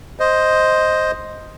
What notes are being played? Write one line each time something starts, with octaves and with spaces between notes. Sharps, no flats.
C5 D#5